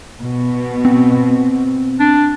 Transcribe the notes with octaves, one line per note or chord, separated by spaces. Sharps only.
B2
C4
D4